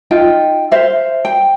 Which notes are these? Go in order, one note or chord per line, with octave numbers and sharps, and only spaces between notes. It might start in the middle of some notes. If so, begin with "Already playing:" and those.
D#4 F4 G5
C5 E5 F5
G5